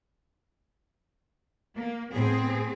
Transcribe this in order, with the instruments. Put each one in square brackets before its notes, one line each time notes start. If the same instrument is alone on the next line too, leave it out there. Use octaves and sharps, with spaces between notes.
[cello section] A#3
[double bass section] A2 [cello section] B3 C4 G#4